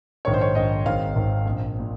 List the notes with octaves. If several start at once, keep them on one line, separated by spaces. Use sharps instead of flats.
A#1 G#2 D#3 C#5
C5
C#5
A#1 G#2 D#3 D#5
G#1 G#2 D#3 F5
G#1 G#2 D#3
A#1 A#2
A#2